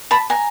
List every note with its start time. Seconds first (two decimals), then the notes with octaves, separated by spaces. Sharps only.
0.11 A5 B5
0.30 G#5 A#5